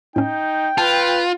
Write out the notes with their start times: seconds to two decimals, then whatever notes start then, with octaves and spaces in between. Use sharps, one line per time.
0.16 A2 C#4 D#4 G5
0.78 F4 B4 A5